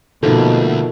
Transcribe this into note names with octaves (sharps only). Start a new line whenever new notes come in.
D2 B2 F3 A#3 D#4 A4